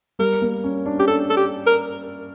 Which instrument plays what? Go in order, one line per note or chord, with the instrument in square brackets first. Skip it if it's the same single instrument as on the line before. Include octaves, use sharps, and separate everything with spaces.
[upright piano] G3 [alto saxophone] A#4
[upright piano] A#3
C#4
D4
[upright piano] C#4 [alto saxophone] G4
[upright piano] D4 [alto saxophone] A4
[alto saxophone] A4
G4
A#4